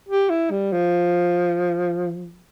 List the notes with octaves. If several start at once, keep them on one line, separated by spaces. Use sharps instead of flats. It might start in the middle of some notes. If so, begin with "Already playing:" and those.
G4
E4
G3
F3